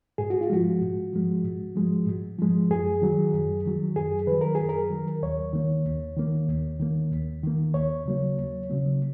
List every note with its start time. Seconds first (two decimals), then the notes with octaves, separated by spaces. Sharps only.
0.18 G#2 G#4
0.30 F#4
0.41 F4
0.50 F3 G#3 F#4
0.81 G#2
1.13 F3 G#3
1.44 G#2
1.76 F3 G#3
2.07 G#2
2.39 F3 G#3
2.71 F#2 G#4
3.02 D#3 F#3
3.33 F#2
3.65 D#3 F#3
3.96 F#2 G#4
4.27 D#3 F#3 B4
4.41 A#4
4.55 F#2 G#4
4.69 A#4
4.90 D#3 F#3
5.23 D#2 C#5
5.53 D#3 A#3
5.86 D#2
6.16 D#3 A#3
6.49 D#2
6.80 D#3 A#3
7.12 D#2
7.43 D#3 A#3
7.74 D#2 C#5
8.06 C#3 F#3 A#3
8.38 D#2
8.69 C#3 F#3 A#3